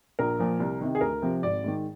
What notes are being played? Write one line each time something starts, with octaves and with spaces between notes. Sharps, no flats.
A#1 A#4
A#2 F3
C2
C3 D#3
G#4
D2 A#4
C3 F3
G#1 D5
G#2 D#3